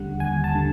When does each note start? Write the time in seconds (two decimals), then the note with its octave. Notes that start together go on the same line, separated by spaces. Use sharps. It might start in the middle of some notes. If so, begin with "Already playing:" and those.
Already playing: D#2 D3 G3 F#5
0.20 D#2 G#5
0.44 A5
0.55 D3 G3